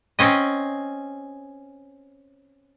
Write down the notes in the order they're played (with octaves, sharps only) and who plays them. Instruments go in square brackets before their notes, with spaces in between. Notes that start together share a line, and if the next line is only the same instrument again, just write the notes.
[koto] C4 C#4 D#5